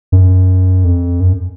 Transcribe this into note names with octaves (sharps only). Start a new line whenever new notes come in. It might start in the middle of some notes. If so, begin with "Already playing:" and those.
F#2
F2
F#2